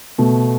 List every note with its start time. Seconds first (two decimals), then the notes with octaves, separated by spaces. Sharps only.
0.18 B2 A3